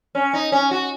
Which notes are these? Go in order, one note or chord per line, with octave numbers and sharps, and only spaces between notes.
C#4
D#4
C#4
F#4